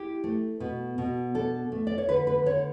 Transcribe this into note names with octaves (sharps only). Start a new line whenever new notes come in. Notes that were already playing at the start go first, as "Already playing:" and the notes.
Already playing: E4 G4
A3
B2
B2
D4 A4
A3
D5
C#5
D3 B4
B4
D3 C#5